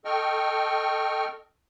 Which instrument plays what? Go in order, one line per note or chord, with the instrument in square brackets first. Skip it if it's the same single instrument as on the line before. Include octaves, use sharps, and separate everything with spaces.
[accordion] A4 D#5 G5 C#6 F6